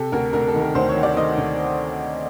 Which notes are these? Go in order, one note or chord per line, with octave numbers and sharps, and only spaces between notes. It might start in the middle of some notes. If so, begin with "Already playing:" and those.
Already playing: C3 A4
D2 A#4
D2 A#4
A4
D#3
A#4
D2 C5
C#5
D#3
D5
D#3 D#5
D2